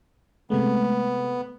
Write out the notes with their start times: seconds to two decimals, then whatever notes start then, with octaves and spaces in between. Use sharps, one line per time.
0.50 C3 G#3 A3 B3